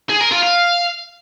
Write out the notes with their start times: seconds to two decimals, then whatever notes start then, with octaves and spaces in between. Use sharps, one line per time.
0.09 G#4
0.21 A#4
0.32 F4
0.43 F5